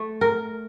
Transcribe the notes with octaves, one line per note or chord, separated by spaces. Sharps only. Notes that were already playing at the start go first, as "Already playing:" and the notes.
Already playing: A3
A#4